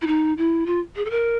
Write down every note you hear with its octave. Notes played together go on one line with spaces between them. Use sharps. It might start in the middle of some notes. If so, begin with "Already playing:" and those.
E4
D#4
E4
F4
G#4
A4
A#4